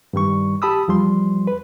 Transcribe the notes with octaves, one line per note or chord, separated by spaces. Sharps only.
G2 D#3 G3 C#6
G4 A5 B5 D#6 E6
E2 F3 G3 C6
B4